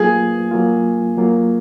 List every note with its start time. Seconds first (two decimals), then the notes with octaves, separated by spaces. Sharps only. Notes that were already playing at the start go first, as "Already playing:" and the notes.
Already playing: F#3 A#3 F4 G#4
0.51 F#3 A#3 F4
1.17 F#3 A#3 F4